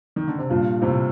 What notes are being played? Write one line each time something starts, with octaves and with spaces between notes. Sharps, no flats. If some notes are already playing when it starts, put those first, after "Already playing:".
D#3
D3
C3
G2 A#2
A2 C3